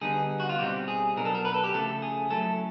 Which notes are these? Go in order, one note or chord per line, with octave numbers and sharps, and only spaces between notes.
D3 G3 B3 D#4 G#4
F#4
F4
B2 G3 C4 D#4 G4
G#4
B2 F#3 B3 D4 A#4
A4
A#4
B4
A4
G4
C#3 F3 A3 A4
G#4
F#3 A3 C#4 E4 A4